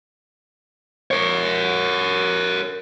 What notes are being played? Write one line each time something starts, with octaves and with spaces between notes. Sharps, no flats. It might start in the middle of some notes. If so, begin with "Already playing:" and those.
A#4 C#5